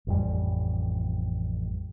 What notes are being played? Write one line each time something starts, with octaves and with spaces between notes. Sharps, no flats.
A1 F2 G3